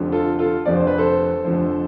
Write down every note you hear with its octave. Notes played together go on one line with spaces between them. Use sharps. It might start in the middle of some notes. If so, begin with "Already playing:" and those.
Already playing: F1 F2 D3 F3
F4 A4
F4 A4
F1 F2 D3 F3 D5
C5
B4
A4 C5
F1 F2 D3 F3